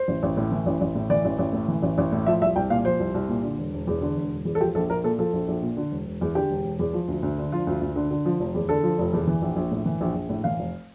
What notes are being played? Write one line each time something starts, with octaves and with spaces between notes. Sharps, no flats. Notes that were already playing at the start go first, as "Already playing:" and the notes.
Already playing: C5
A1
A1
A2
E3
A1
A1
A2
E3 D5
A1
A1
A2
E3
A1
A1
A2
F3 E5
C2 E5
C2 G5
A#2 F5
F3 C5
C2
C2
A#2
D3
E1
E1
E2
D3
E1
E1
E2
A4
F3 G4
A#1 A4
A#1 A#4
A#2 A4
F3 A4
A#1
A#1
A#2
D3
E1
E1
E2
D3 G4
E1
E1
E2
F3
D2
D2
D3
F3 F4
D2
D2
D3
D3
F3
F1
E2
D3 A4
F3
F1
E2
E3
A#1
A#1
A2
E3
A#1
A#1
A2
E3 F5
F1